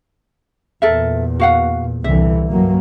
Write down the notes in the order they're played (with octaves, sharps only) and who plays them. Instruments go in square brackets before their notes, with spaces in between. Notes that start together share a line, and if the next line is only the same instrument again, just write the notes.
[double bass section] E2 A#2 [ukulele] A4 A#4 E5
[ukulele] F#4 F5 F#5
[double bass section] C2 D3 E3 [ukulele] E5
[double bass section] G2 F#3 A#3